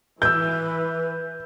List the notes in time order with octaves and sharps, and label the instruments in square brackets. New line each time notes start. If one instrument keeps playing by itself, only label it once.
[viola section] E3 [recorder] B4 [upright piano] E6 G6